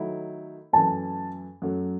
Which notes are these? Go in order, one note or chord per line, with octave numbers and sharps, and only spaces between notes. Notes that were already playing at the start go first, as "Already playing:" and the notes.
Already playing: D#3 F#3 A3 E4
F#2 E3 A3 A5
F#2 F#3 A3